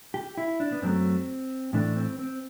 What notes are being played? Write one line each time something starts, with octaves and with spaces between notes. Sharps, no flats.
G4
E4
D4
B3
F#2 F#3 A3 C4
A2 E3 A3 D4
C4
C4